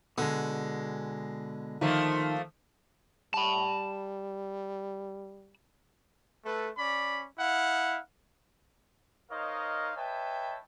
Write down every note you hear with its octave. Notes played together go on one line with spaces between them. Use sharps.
B2 D3 G#3
D#3 F3 A3 A#3
G3 A5 B5
A3 A4 B4
C#4 D5 B5
E4 F5 F#5
D#4 A#4 C5 C#5 D#5 F5
B4 C#5 D#5 E5 G5 A5